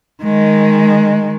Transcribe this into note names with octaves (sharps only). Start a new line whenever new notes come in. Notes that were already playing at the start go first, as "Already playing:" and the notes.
D#3 G#3